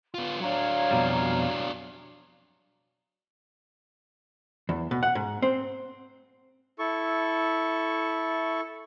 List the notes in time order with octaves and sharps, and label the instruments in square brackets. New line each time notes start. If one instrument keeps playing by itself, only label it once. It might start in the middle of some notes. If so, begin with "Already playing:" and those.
[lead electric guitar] B3 F4 [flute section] F5 C6
[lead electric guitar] F#3 D4 [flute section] C#5 F5 A#5
[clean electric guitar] F2 B2 G3
[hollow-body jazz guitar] E2
B2
F#5
G#2
C4
[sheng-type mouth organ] E4 A4 C#6